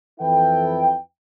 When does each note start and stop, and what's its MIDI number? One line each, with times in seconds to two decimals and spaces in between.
0.20 0.95 41
0.20 0.95 52
0.20 0.95 64
0.20 0.95 69
0.20 0.95 71
0.20 0.95 79